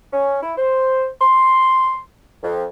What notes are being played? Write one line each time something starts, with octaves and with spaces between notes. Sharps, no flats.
C#4
E4
C5
C6
F2